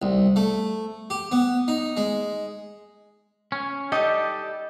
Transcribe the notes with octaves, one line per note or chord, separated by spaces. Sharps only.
C2
A3
G4
B3
D#4
G#3
C#4
G3 D#4 G4 A4 D#5